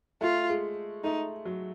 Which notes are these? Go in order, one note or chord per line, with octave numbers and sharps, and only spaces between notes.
A3 F4
G#3
A3 D#4
F#3